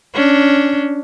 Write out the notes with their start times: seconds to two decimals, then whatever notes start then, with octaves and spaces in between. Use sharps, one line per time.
0.14 C#4 D4